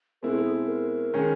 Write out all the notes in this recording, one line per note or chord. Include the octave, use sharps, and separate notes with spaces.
B2 G#3 C4 E4 A#4
A4
G#4
A4
A#4
D#3 G#3 C#4